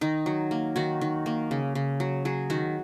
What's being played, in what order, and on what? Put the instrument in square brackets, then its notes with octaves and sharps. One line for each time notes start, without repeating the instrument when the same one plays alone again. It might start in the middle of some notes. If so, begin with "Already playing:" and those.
[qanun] D#3 D#4
F#3
A#3
D#3 F#4
D#3
A#3
C#3
C#3
F#3
F#3 G#4
D#3 F#4